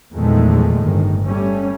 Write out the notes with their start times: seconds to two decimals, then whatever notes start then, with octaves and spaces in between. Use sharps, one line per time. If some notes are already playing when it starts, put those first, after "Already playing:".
0.12 E2 A#2 D#3 F3 G#3 A3
0.80 G1 A2 D#3
1.26 G3 A3 C#4